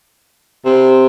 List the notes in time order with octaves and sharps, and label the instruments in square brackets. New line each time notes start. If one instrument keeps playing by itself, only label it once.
[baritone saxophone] C3